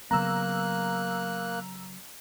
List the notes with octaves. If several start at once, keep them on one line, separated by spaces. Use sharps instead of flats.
C#3 F#3 A#3 B3 A#5 E6 F#6